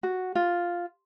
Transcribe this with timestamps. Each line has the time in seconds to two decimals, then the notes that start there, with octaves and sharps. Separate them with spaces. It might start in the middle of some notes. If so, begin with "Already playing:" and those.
0.03 F#4
0.35 F4